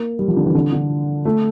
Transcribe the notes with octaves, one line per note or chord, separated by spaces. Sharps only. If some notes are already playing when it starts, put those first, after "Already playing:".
Already playing: A#3
G3
F3
D3
E3
D3
D3
A3